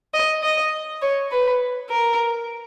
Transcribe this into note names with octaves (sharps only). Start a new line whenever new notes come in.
D#5
D#5
C#5
B4
A#4